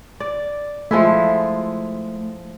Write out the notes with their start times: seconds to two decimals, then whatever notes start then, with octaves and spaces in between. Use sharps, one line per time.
0.20 D5
0.91 F3 G#3 A3 E4